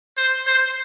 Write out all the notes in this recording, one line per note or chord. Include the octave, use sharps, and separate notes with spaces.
C5
C5